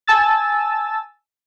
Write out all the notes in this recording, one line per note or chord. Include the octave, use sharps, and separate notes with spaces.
G#5 A5 E6 A6